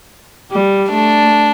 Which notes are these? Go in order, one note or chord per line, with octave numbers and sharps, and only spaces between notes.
G3
A3 D4